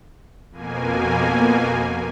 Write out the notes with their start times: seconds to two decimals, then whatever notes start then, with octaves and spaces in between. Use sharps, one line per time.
0.51 F2 B2 A#3 G#5